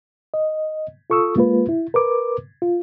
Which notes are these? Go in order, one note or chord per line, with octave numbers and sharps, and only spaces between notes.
D#5
F4 A4 C#6 D#6 E6
G#3 A#3 F4 B4
E4
A#4 B4 D6
F4